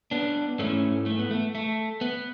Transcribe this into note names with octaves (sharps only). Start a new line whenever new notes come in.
B3 D4
G#2 E3 A3 C#4
A3
B3
A3
A3
B3